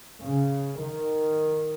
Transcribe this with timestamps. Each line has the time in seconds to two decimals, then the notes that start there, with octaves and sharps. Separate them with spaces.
0.21 C#3
0.79 D#3